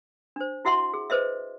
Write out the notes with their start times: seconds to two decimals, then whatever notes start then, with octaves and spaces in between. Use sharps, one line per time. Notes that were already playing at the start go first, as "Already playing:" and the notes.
0.36 D4 C5
0.65 E4 F#4 E5 F#5 C6
0.94 G#4
1.10 G#4 B4 C5 D#5 E5